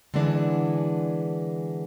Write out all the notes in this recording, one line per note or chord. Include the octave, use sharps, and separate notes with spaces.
D3 E3 G#3 B3 D4